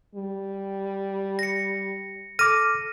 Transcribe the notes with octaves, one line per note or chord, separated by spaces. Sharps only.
G3
A#6 C#7
A4 D6 F6 A#6 D#7